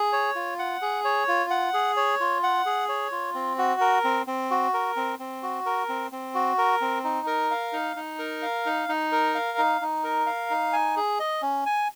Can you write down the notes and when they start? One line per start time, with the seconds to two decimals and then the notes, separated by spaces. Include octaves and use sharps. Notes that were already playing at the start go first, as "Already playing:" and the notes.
Already playing: G#4
0.13 C#5
0.35 F4
0.59 F#5
0.82 G#4
1.04 C#5
1.28 F4
1.50 F#5
1.74 G#4
1.97 C#5
2.20 F4
2.43 F#5
2.66 G#4
2.89 C#5
3.12 F4
3.35 C4
3.58 F#4
3.81 A#4
4.04 C4
4.27 C4
4.51 F#4
4.74 A#4
4.96 C4
5.19 C4
5.43 F#4
5.66 A#4
5.89 C4
6.12 C4
6.35 F#4
6.58 A#4
6.81 C4
7.04 D#4
7.27 A#4
7.51 F5
7.73 D#4
7.96 D#4
8.19 A#4
8.42 F5
8.66 D#4
8.89 D#4
9.12 A#4
9.35 F5
9.58 D#4
9.81 D#4
10.04 A#4
10.26 F5
10.50 D#4
10.73 G#5
10.96 G#4
11.20 D#5
11.42 C#4
11.66 G#5